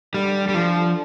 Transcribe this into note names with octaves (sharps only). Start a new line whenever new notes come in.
D3 G3
G3
F3